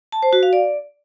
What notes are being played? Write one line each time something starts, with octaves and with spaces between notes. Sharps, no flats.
A5
C5
F#4
F5
D5